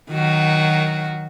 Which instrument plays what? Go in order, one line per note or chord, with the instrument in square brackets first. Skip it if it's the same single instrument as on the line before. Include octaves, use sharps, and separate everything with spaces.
[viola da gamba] D#3 F#3 F#4